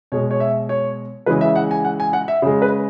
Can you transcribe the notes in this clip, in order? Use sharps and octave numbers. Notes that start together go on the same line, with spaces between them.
B2 G#3 C#5
C#5
E5
C#5
C#3 E3 G#3 B4
E5
F#5
G#5
F#5
G#5
F#5
E5
C#3 G#3
B4